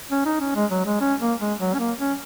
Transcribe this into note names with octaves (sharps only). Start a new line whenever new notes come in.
C#4
D#4
C#4
G#3
F#3
G#3
C#4
A#3
G#3
F#3
C#4
A#3
C#4